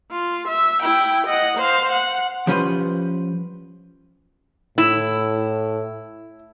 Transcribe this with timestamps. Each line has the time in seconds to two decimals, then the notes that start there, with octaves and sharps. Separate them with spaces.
0.11 F4
0.48 E5
0.81 E4 G5
1.26 D#5 F#5
1.57 C5 F5
1.91 F#5
2.47 F3 G3 C#4 F4 B4 C5
4.78 A2 E4